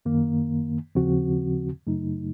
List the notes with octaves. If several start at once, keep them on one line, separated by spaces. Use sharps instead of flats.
F#2 D#3 A#3
D#2 C#3 F3 C4 F#4
F#2 C#3 F#3 A3 D#4